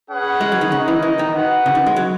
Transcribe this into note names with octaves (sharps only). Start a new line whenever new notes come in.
C#4 G#4 B4 F#5
G#3
F#3
D#3
C#3 D#4 A#4 D#5
E3
E3
D#3
F#4 B4 F#5
C#3
D#3
G#3
F#3